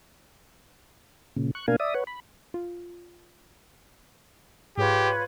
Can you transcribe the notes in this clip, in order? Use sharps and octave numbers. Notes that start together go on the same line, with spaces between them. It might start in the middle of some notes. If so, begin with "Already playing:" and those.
A#2 C#3
C#6 F#6
B2 A#3 D4 A#4 F5 G#5
D5 E5 D#6
B4 C#5 F#5
B5
F4
G#2 F4 G4 G#4 B4 C#5 G6